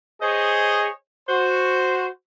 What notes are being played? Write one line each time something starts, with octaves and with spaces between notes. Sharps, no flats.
G#4 C5 C#5 D#5
F#4 C5